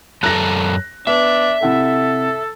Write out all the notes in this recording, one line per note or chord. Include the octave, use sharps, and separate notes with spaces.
F#2 A4 A#5 F#6 A#6
B3 D4 E5
C3 E4 A4 F#5